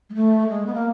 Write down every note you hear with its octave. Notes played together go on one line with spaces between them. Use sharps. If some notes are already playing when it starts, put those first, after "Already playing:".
G#3
A3
G#3
B3
A#3